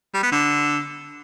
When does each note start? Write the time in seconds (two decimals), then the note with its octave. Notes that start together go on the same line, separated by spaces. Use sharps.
0.14 G3
0.23 B3
0.32 D3